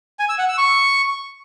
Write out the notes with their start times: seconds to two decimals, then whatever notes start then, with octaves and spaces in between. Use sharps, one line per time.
0.19 G#5
0.29 E6
0.39 F#5
0.48 E6
0.58 C#6